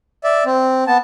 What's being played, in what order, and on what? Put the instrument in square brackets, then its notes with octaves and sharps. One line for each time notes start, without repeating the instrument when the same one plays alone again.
[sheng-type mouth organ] D5 E5
C4
B3 A5